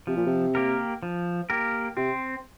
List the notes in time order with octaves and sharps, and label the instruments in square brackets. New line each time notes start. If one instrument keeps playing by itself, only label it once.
[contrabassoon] C3 [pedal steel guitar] F3
[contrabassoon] A#2
C3
[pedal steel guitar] A#3 G4 A#4
F3
A#3 G4 A#4
[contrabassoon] C3 [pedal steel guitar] C4